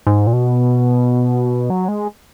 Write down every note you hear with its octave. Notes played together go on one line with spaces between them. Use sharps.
G#2
A#2
B2
F#3
G#3